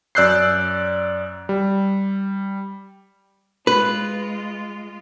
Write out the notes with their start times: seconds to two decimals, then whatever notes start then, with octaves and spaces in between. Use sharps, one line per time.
0.15 F#2 D5 E6 F#6 G6 C7
1.49 G3
3.67 G#3 F4 B4